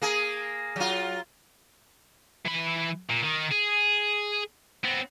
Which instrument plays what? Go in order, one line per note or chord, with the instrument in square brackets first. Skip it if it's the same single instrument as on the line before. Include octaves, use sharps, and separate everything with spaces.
[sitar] A#3 G#4
F#3 F4
[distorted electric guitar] E3 B5
A#2
D#3
G#4
B3 C4